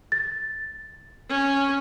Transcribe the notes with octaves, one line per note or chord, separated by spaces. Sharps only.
A6
C#4